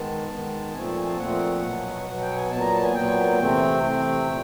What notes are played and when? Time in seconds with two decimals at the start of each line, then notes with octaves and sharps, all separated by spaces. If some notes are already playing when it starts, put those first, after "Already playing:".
Already playing: D#3 G#3 B3 A5
0.29 D#3 G#3 B3
0.73 A#2 F3 A3 C4 G#5
0.85 A5
0.96 G#5
1.06 A5
1.18 A#2 F3 A3 C4 F#5
1.62 B2 F#3 B3
2.06 B2 F#3 B3 F#5
2.21 G5
2.36 G#5
2.50 A#2 F#3 B3 A5
2.61 A#5
2.72 A5
2.83 G#5
2.94 A#2 F#3 B3 G5
3.39 C3 E3 A3 C4
3.83 C3 E3 A3 C4
4.27 A#2